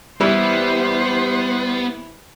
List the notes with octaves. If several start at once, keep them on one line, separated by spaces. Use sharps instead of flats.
E3 G3 B3 C5